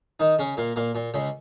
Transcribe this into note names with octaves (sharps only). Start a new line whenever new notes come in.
D#3 D#4
C#3 C#4
A#2 A#3
A#2 A#3
A#2
C#2 C#3